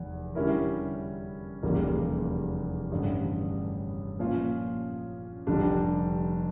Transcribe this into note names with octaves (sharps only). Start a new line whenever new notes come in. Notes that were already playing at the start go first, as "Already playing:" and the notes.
Already playing: F1 E2
D3 G3 C#4 E4 A#4
F1 E2 C#3 G3 A#3
A1 G2 D3
A#2 F3 C#4 F4
F1 F2 D3 G3 D4